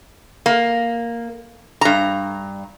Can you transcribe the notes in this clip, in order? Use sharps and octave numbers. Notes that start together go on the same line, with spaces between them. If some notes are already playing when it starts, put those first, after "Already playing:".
A#3
G2 A#5